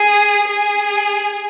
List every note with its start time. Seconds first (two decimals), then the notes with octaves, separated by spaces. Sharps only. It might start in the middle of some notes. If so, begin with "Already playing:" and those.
Already playing: G#4
0.49 G#4